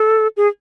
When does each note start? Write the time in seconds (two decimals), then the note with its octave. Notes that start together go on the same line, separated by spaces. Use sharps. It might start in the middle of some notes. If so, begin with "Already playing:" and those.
Already playing: A4
0.37 G#4